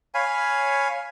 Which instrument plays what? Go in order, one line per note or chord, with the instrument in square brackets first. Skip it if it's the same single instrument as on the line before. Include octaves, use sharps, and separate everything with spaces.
[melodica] C#5 F5 G#5 B5